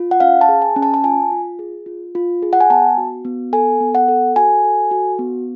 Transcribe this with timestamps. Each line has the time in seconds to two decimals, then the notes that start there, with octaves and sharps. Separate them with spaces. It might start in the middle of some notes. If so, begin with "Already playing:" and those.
Already playing: F4
0.11 F#5
0.20 C#4 F5
0.41 A5
0.49 G#4
0.62 G#5
0.76 C#4
0.83 A5
0.94 A5
1.03 F4 G#5
1.32 F4
1.59 G#4
1.86 F4
2.15 F4
2.42 G#4
2.53 F#5
2.60 G#5
2.70 B3 A5
2.98 F#4
3.25 B3
3.53 A4 G#5
3.81 B3
3.95 F#5
4.08 A4
4.36 F#4 G#5
4.64 A4
4.91 F#4
5.19 B3